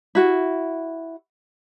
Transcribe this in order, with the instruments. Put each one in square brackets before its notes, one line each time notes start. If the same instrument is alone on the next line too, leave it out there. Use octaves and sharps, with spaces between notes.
[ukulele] E4 F#4